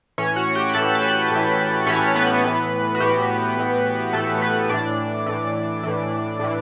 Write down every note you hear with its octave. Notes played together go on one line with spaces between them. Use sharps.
A2 E3 C#4 C#5
F#4 F#5
G4 G5
B5
A2 E3 A4 A5
A5
B4 B5
A2 E3
A2 E3 C#4 C#5
B3 B4
A2 E3
F#4
A2 E3 G4
A2 E3
A2 E3 A3 A4
B3 B4
A2 E3 D4 D5
A2 E3
A2 E3
A2 E3